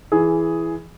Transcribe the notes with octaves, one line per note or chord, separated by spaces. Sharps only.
E3 G#4